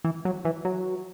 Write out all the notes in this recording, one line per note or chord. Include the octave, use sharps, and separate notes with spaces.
E3
F#3
E3
F#3